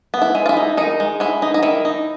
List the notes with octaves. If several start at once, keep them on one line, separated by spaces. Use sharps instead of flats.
B3
E4
G#3
F4
E4
D#4
D#3 D#4
G#3
G#3 E4
D#4
D#4
D#3 E4
D#4